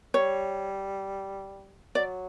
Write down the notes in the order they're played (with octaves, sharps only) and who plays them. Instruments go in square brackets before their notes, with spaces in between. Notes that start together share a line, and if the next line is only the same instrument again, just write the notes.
[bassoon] G3 [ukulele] C#5
[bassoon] F#3 [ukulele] D5